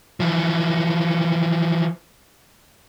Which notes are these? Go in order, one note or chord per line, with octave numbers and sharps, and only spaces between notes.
E3 F3